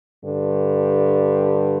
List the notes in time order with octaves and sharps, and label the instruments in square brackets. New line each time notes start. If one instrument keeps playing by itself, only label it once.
[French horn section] G2 D3 G3